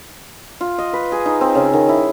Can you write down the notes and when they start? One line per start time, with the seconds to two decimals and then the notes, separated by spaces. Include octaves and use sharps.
0.61 F4
0.78 D#5
0.93 B4
1.12 G#4
1.26 D#4
1.41 C4
1.55 C#3
1.73 D#3
1.89 E4